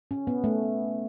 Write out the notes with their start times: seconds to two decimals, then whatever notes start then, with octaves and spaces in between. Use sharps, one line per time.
0.11 C#4
0.27 B3
0.44 A3